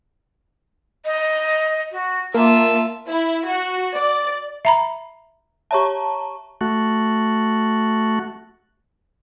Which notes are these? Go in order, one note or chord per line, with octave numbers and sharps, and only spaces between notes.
D#5
F#4
A#3 F4 E5 A5
E4
F#4
D5
E5 A#5 B5
G4 C#5 E5 A5 A#5 C#6
A3 F#4